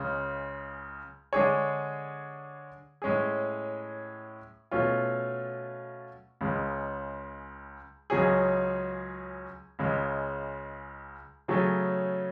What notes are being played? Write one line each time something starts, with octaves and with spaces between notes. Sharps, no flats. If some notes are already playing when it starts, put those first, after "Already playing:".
Already playing: C#2 C#3 G#3
D3 G#3 D4 G#4 C#5
A2 G#3 C#4 G#4
B2 A3 C#4 F4
C#2 C#3 G#3
C#2 C#3 F#3 C#4 G#4
C#2 C#3 G#3
C#3 F#3 A3 C#4 G#4